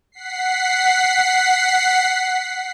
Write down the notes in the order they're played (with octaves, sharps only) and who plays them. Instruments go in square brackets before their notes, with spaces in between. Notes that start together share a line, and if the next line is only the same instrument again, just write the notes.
[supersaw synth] F#5 B6 C7